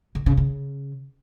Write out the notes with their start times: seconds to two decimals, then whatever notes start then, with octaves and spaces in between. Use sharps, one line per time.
0.15 D3
0.26 C#3
0.37 C#3